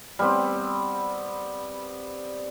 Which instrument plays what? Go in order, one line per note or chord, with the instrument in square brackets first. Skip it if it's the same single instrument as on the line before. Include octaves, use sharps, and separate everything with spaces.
[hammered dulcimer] G3 B3 C4